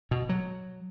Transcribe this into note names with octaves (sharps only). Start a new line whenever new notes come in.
B2
F#3